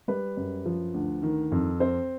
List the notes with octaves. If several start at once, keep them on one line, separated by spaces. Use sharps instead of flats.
G3 B4
F#2
F3
D2
D#3
F2
C4 C5